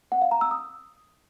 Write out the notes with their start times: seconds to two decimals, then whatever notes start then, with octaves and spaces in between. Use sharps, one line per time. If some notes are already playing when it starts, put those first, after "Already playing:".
0.12 F#5
0.22 F5
0.31 A#5
0.41 E6
0.51 D#6